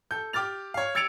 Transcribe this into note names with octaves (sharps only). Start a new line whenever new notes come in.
A4 G6
G4 D6 F6 A6 F7
C#5 F5
E6 G#6 A6 C#7 D7 F7